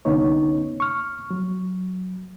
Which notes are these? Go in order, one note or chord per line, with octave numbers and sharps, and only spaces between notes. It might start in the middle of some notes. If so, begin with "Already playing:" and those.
C2 D3 B3 C#4 D#4 C#5
C#6 F6
F#3